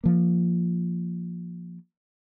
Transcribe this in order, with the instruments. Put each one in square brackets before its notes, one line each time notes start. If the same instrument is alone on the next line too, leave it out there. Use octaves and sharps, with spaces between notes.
[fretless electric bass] F3 A#3